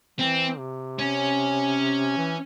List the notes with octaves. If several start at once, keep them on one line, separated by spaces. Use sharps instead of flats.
E3 C4
C3
C#4
E3